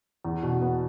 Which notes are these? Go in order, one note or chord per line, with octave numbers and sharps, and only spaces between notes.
E2
B2
B3